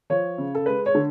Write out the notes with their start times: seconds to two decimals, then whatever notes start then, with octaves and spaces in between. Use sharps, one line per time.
0.10 F3 C#5
0.38 C#3
0.55 A4
0.66 G#3 B4
0.86 C#5
0.95 D3